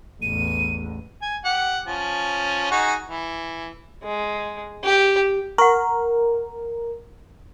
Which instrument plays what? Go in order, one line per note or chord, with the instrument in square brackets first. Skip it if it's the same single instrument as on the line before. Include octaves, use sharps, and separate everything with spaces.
[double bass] A1 E2 [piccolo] D#7
[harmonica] G#5
G4 F#5
F3 C#4
D#4 F#4 G#4
E3
[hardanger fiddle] G#3
G4
[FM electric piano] A#4 [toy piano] F#5 C#6